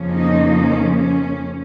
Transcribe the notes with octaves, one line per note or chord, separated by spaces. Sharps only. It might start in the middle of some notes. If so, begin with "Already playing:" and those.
Already playing: F2 C#3 F3 A#3 C#4
D#4
C#4
C#4